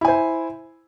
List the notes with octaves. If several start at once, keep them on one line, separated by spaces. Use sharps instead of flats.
E4 C5 G#5